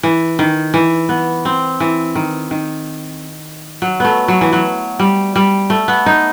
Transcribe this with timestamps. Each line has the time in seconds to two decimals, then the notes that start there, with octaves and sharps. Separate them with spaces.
0.03 E3
0.39 D#3
0.74 E3
1.09 B3
1.45 C4
1.80 E3
2.15 D#3
2.51 D#3
3.82 F#3
4.00 A3 B3
4.28 F#3
4.41 E3
4.53 F#3
4.99 G3
5.36 G3
5.70 A3
5.88 B3
6.06 D#4